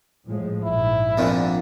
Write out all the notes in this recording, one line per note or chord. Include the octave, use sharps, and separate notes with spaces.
A2 F3 G#3
A#1 G#2 E4
F2 A#2 D3